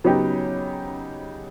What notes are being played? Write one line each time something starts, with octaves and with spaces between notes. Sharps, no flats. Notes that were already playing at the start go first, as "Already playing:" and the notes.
C#3 F#3 B3 D#4 G4